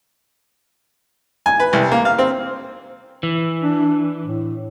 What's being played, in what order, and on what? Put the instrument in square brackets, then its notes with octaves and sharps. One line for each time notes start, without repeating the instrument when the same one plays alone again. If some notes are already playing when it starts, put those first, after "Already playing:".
[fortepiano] G#5
B4
C2
A#3
F5
C4
[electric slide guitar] E3
[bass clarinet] D4
A2